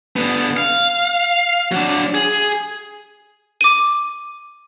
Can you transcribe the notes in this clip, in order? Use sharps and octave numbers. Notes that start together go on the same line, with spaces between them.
D3 B3
F5
F#3 D4
G#4
D6 D#7